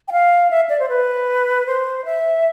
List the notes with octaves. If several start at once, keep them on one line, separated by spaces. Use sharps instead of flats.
G5
F5
E5
D5
C5
B4
C5
E5